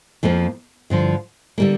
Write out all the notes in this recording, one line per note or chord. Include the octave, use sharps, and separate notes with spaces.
F2 F3 A#3
G2 D3 F3
D3 G3 A#3